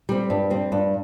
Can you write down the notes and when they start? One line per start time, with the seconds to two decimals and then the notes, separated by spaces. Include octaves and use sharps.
0.09 G3 C4
0.30 G2
0.50 G3 C4
0.72 G2